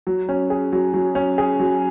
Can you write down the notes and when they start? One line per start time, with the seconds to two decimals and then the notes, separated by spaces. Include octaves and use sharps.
0.07 F#3
0.29 C#4
0.50 G#4
0.72 F#3
0.94 F#3
1.15 C#4
1.38 G#4
1.59 F#3